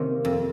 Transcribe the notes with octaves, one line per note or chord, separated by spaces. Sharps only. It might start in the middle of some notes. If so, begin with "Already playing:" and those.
Already playing: C3 D#3 A#3 C#4
F2